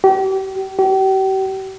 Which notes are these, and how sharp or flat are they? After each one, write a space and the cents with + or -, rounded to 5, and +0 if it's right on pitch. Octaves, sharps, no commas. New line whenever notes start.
G4 -35
G4 -40